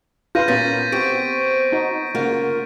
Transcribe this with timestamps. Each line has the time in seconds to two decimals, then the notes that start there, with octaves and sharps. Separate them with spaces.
0.35 F4 B4 C6 G6 A#6 D#7
0.48 A#2 B3 C#4 A#4 A6 B6
0.92 C4 F#4 G4 C5 C#6 D7
1.72 D#4 F#4
2.15 C#3 A#3 F4 F#4 A#4